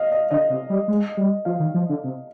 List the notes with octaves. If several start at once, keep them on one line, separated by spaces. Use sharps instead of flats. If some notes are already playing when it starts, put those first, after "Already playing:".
Already playing: D#5 F5
D#5
D3 D#5
C3
G3
G#3
G3
F3 F5
D#3
F3
D3
C3